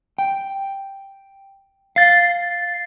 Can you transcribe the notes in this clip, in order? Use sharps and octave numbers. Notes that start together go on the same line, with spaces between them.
G5
F5 A6 C7